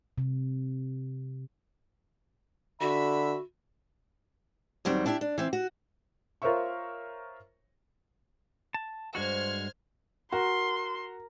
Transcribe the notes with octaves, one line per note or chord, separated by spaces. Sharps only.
C3
D3 F#4 E5 B5
D#2 F#3 G3 C4
D4 E4 G4 E5
D4
E3 C4
F#4
F4 A#4 C5 C#5 E5 C#6
A5
G2 G#3 F#4 C5 F6 G#6
F#4 A#4 C6